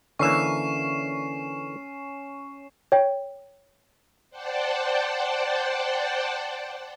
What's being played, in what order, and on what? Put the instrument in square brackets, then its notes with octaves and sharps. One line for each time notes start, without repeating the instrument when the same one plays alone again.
[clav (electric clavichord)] D3 E3 A#3 [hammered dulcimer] C#4 [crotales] C#6 C7 E7
[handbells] C#5 G5
[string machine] C5 D5 F#5 G5 A5